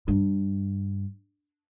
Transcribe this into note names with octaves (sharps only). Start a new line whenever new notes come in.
G2